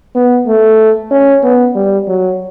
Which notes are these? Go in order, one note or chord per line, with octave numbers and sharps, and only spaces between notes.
B3
A3
C#4
B3
G3
F#3